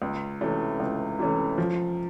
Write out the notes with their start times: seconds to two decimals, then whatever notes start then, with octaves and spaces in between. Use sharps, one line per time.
0.02 C#2
0.41 C3 E3 A3 C#4
0.80 C#2
1.19 C3 E3 A3 C#4
1.58 F3